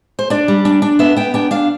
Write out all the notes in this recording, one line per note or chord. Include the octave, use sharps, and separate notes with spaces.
C5
D4 D5
G3
D4
D4
B3 E5
B3 G5
D4 G5
D4 F5